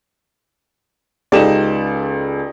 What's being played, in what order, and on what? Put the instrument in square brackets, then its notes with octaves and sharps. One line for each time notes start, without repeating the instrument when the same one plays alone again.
[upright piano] C#2 A4 E7 [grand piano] D#4 G4 D5